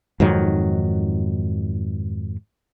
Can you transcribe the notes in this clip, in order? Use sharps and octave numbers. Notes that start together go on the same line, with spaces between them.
F2 G#2 D#3 F#3